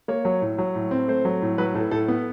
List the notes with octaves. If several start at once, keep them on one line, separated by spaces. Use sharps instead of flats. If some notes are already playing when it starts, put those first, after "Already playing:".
A#3 C#5
F#3
A2
F#3
A2
C4
A3 C5
F#3
A2
F#3 B4
A2 A4
A2 A4
B3